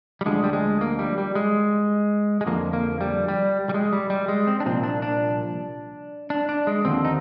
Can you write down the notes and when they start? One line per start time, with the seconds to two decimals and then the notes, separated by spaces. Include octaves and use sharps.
0.21 G3
0.26 D2 D3 F3 G#3
0.44 G3
0.53 G#3
0.81 A#3
0.99 G3
1.18 G3
1.35 G#3
2.41 G#3
2.46 F2 D3 F3 A#3
2.73 A#3
3.01 G3
3.28 G3
3.69 G3
3.74 G#3
3.93 G3
4.10 G3
4.28 G#3
4.47 C4
4.60 D4
4.66 C2 A#2 F3 C4
4.83 D4
5.02 D4
6.30 D4
6.49 D4
6.67 G#3
6.85 D#2 D3 F3 C4
7.05 D#4